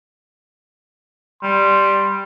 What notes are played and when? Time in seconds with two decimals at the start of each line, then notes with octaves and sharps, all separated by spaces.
1.43 G3 C6